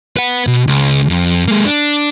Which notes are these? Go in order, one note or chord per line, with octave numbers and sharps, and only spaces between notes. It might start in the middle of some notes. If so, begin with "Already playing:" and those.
B4 F#5
B2
C#2
F2
G#3 A#3
D4